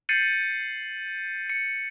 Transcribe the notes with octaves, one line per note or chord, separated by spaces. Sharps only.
G6 A6 C7 C#7 D#7 F#7
C#7